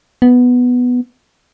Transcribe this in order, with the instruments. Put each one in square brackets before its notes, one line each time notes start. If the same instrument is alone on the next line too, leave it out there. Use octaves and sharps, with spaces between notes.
[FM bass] B3